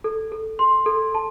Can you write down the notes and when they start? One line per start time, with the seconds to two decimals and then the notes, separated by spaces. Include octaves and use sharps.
0.04 A4
0.32 A4
0.59 C6
0.86 A4
1.15 A5